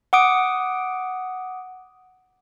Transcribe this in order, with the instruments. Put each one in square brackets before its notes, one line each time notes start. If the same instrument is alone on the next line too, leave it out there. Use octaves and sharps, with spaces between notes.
[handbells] F#5 D6 D#6 D7